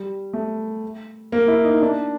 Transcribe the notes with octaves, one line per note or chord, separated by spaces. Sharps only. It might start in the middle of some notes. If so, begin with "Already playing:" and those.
Already playing: G3
A3
A#3
E4
D#4
D4